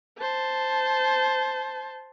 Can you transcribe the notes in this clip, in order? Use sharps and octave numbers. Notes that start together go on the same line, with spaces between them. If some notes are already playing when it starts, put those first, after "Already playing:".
C5 A5